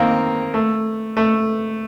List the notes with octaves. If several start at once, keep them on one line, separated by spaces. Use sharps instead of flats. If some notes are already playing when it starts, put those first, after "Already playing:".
Already playing: D#3 A#3 C4
A3
A3